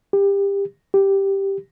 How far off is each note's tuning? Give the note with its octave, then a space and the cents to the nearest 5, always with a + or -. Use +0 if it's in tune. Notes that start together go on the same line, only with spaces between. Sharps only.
G4 +25
G4 +0